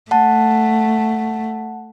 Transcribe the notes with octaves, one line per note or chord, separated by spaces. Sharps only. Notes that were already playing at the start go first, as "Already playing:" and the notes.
A3 F#5 A5